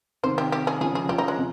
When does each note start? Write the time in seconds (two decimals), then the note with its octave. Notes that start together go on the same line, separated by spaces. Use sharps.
0.23 C3 D#3 C5
0.38 G4
0.52 G4
0.67 G#4
0.80 C#3 F3 G#4
0.95 G#4
1.09 C#3 F3 G4
1.18 D#4
1.28 G#3
1.37 C3